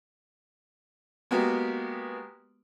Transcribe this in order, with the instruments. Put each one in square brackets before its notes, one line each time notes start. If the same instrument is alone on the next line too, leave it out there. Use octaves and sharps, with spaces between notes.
[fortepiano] G#3 A#3 B3 F#4 G4